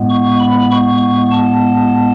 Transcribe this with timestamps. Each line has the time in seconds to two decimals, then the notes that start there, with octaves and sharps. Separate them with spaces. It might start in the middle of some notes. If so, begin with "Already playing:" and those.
Already playing: A2 G#3 B3
0.09 C#6
0.40 B5
0.71 C#6
1.01 C#6
1.31 A5